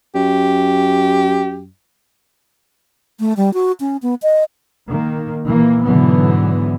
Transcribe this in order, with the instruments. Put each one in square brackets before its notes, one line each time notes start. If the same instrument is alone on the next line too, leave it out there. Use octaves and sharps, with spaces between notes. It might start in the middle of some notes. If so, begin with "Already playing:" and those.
[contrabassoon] F#2 [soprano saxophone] G4
[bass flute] A3
G3
F#4
C#4
B3
D#5
[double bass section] D#3 A#3
A#2 E3 A#3
G#2 B2 D3 E3 F#3 B3